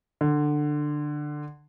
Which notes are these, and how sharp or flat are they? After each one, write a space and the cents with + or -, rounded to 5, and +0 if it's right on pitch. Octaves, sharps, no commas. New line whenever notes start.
D3 +15